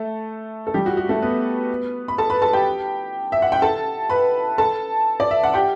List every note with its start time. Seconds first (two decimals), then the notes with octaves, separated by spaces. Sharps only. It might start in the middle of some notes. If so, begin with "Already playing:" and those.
Already playing: A3 A4
0.67 A4
0.74 G3 G4
0.86 F#4
0.97 F#4
1.09 A3 A4
1.22 B3 B4
2.08 B5
2.18 A4 A5
2.30 B4 B5
2.42 A4 A5
2.53 G4 G5
3.32 E5
3.42 F#5
3.52 G5
3.62 A4 A5
4.10 B4 B5
4.58 A4 A5
5.20 D5
5.31 E5
5.43 F#5
5.54 G4 G5